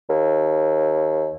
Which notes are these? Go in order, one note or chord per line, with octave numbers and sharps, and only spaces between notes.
D#2